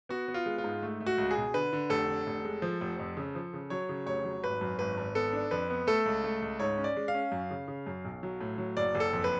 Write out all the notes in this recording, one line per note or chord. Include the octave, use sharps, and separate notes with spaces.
B3 F#4
B3
F4
G#3
F4
G#2
A3
A3
F#4
C#2
G#4
B2
D3 B4
D3
F1 A4
D3
F1
G#3
F3
F1
F2
C#3
F3
C#3
F#3 C#5
C#3
F1 C#5
F#3
G#1 B4
F#2
G#1 B4
G#1
B3 A4
D4
F2 B4
B3
A3 A4
C#2
A3
C#2
G#2 C#5
C#4
D5
G#3
F5
C#4
F#2
C#3
C#3
F#2
B1
F#3
A2
F#3
F#1 D5
F#1
A4
F2
B4